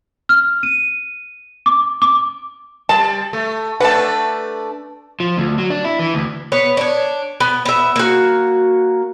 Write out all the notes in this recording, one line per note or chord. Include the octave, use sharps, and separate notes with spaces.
F6
D#7
D6
D6
G3 A5
A3
A3 D4 B4 F#5 A5
F3
D2
F#3
D4
E4
E3
D2
B3 B4 C#5
D4 C#5
B3
B3 E5
A#3 F#4